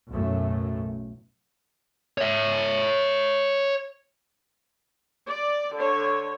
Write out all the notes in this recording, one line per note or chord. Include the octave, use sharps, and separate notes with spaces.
B1 F#2 A2 A3
C#5 E5
D5
D3 C#5